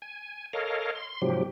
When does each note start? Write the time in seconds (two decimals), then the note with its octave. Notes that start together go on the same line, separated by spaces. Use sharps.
0.02 G#5
0.53 A4 A#4 C#5 D#5 F5
0.95 C6
1.22 G#2 C3 F3 F#3 G4